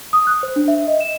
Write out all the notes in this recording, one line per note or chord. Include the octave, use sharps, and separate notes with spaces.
D#6
F#6
C5
D4
E5
D#5
E7